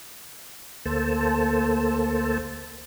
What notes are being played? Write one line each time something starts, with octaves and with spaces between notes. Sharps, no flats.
D2 A#3 A4 C5 A5